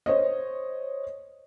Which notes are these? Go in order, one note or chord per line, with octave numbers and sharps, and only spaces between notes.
C5 C#5 D#5